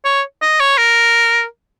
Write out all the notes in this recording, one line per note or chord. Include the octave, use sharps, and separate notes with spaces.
C#5
D#5
C#5
A#4